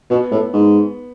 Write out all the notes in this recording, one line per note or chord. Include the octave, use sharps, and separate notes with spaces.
B2 B3
A2
G#2